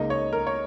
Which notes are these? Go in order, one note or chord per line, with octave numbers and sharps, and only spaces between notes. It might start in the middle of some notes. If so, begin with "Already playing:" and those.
Already playing: C#2 C#3 A#3 D#4 D#5
C#5
A#4
C#5